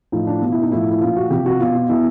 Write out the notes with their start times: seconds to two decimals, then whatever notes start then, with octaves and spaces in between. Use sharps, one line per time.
0.12 A2 F3 D#4
0.27 D4
0.41 B2 F4
0.52 E4
0.62 D#4
0.71 A2 F3 E4
0.90 E4
1.01 A#2 F3 F4
1.16 F#4
1.30 C3 F3 G4
1.46 F#4
1.60 B2 F4
1.75 F4
1.89 B2 E4